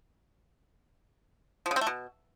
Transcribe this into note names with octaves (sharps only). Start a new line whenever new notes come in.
F3
C#3
C4
A3
B2